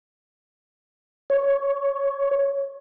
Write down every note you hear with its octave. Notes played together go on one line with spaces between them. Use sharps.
C#5